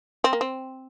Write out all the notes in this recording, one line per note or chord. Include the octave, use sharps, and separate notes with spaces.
C4
A#3
C4